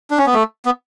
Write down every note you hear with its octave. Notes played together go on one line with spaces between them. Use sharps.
D4
C#4
B3
A3
B3